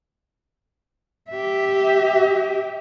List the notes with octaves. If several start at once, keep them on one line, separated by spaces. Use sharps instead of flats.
G4 E5